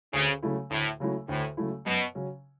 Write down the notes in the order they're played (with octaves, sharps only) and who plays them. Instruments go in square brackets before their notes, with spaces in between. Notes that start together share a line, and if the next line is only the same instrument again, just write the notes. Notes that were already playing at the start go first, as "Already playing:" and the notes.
[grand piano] D2 [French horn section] C#3
[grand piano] C#3 F#3 A3 E4
[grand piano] D2 [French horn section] A2
[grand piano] C#3 F#3 A3 E4
[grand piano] D2 [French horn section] A2
[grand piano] C#3 F#3 A3 E4
[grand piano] F#2 [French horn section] B2
[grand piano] C#3 F#3 C#4